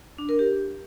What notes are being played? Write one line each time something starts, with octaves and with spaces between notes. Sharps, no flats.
D4
A#4
G4